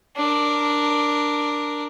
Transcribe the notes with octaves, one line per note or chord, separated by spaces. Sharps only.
D4 A#4